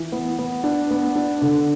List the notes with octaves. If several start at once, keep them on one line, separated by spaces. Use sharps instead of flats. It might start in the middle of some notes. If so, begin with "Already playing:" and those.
Already playing: E3
B3
B3
D4
B3
D4
D3